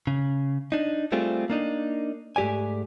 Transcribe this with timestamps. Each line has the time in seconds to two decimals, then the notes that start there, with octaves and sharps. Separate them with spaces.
0.07 C#3
0.72 D4 D#4
1.12 G3 A3 C4 F4 G#4
1.50 A#3 D4 D#4
2.36 G#2 A3 G4 D5 G#5